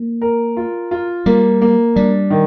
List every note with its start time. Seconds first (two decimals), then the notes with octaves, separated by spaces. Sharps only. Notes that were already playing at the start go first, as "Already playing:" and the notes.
Already playing: A#3
0.22 A#4
0.57 F4
0.91 F4
1.26 G3 A#3
1.61 A#3
1.96 G3 D4
2.30 D#3